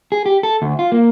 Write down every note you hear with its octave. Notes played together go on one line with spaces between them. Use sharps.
G#4
G4
A4
D2
F4
A#3